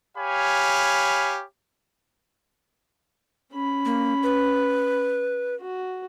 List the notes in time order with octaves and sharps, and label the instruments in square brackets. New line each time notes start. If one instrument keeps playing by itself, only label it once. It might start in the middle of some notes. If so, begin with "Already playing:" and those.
[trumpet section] G4 C#5 F5 G#5 B5
[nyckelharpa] C#4 B5
[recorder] A#3
B4
[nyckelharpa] F#4